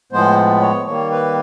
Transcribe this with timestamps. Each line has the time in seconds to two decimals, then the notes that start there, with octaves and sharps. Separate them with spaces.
0.12 A2 F3 G#3 B3 C5
0.61 C#5
0.86 D#3 G3 A#3 C#5
1.11 B4